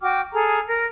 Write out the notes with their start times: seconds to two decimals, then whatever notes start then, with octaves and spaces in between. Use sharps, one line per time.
0.01 F#4 G5 D6 F6
0.33 G#4 A4 A#5 F6
0.68 A#4